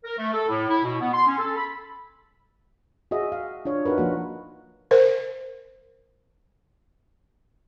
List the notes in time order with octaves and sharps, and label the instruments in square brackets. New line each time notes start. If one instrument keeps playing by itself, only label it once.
[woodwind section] A#4
A3
A4
A2
E4
B2
B3
C6
C#4
A4
B5
[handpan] F#4 G#4 D#5 E5
F5
D4 F4 C#5
D#4 F4 F#4 A#4 B4
F3 A#3 F#4
[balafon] A#4 C5